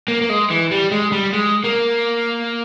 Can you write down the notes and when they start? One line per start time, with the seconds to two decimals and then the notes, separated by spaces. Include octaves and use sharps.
0.08 A#3
0.22 A#3
0.30 G#3
0.51 E3
0.71 G3
0.92 G#3
1.12 G3
1.33 G#3
1.64 A#3